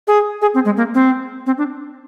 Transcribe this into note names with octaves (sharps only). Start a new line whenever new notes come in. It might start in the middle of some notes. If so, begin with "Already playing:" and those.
G#4
G#4
C4
G#3
A#3
C4
C4
D4